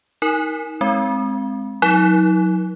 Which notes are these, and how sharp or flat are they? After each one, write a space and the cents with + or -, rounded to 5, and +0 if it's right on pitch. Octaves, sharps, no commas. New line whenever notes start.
D#4 +25 A#4 +0
G#3 +0 C4 +0
F#3 -25 D#4 +45